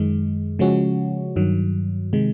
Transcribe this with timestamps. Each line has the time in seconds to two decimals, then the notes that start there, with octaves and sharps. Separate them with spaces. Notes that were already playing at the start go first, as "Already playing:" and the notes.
Already playing: F#2 D#3 G#3
0.59 C#3 F3 G#3 C#4 F#4
1.36 G2 D#3 F#3
2.13 C3 D#3 G#3